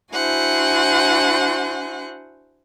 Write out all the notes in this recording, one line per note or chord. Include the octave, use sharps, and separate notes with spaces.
D4 E4 F#4 C5 F#5 G#5